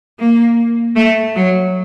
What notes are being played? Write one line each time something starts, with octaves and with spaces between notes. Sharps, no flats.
A#3
A3
F#3